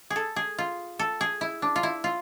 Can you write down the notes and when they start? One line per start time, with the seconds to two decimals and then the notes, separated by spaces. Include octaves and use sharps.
0.10 G#4
0.16 A4
0.36 G#4
0.58 F4
0.99 A4
1.21 G#4
1.41 E4
1.62 D4
1.76 F4
1.83 E4
2.04 F4